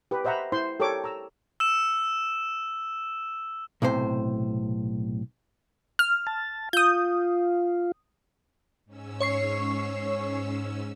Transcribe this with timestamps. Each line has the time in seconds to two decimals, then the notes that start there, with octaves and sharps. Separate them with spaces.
0.11 G4 B4
0.25 C5 D#5 E5 F#5 A#5 B5
0.52 E4 C5 C6
0.80 G4 A4 A#4 C#5 D6
1.04 A#5 E6
1.60 E6 E7
3.82 B1 A2 C3 C5
5.99 F6
6.27 A5
6.73 F4 D#6 G6
8.85 G#2 C#4 E6
9.20 C#5 C#6 C7